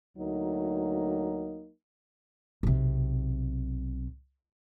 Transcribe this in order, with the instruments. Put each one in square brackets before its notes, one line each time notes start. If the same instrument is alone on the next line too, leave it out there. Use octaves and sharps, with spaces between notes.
[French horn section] D2 F#3 A#3 D#4
[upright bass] B1 C3